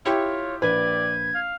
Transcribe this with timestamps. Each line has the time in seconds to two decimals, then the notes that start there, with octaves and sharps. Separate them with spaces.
0.06 E4 F4 G4 C#5 E5
0.62 A#1 B4 D5 G#6
1.35 F5